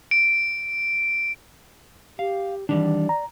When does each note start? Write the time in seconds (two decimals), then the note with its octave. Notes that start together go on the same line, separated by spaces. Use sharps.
0.11 D7
2.19 G4 F5
2.69 D#3 E3 G3 D4 D5
3.09 A#5